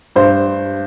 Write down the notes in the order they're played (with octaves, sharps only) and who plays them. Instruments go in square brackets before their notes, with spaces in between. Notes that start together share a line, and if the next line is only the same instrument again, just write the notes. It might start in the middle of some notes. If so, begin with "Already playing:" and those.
[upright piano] G2 C5